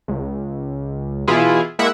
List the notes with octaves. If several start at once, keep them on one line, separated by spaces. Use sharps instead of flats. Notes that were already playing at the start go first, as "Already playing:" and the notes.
C#2
B2 E3 E4 F4 G#4
G#3 A#3 E4 E5 F#5